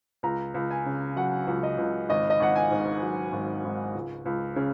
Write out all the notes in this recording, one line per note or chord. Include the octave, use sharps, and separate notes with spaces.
C#2 A#5
C#2
G#5
C#3
F#3 F#5
C#2
D#5
C#2
G#1 D#5
D#5
G#1 F#5
G#5
G#2
F#3
G#1
G#1
C#2
C#2
C#3